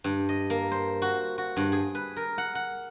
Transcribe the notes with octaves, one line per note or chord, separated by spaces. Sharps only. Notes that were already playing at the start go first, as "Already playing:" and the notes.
G2
D#5
A#3
C5
F#4
F#4
G2
G#4
B4
A#4
F#5
F#5